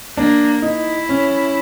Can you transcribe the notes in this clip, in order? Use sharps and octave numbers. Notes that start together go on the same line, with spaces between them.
A#3 D4
D#4 E4
C#4